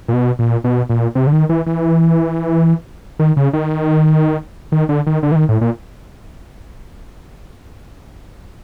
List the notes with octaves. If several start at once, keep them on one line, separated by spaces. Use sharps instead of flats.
A#2
B2
A#2
B2
A#2
C3
D3
D#3
E3
E3
D#3
C#3
D#3
D#3
D3
D#3
D3
E3
D#3
A2
A#2